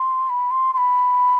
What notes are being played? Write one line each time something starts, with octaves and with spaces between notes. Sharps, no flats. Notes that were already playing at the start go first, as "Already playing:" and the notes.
Already playing: C6
B5
C6
C6
B5